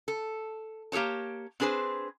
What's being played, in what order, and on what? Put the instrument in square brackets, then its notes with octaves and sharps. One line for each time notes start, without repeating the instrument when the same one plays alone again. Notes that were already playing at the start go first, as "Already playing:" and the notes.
[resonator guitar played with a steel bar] A4
A#3 G4 A4 C#5 A5
C4 D4 G#4 B4 C5